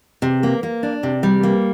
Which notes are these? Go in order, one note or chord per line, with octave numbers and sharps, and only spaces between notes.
C3
A#3
A#3
D4
C3
G3
A#3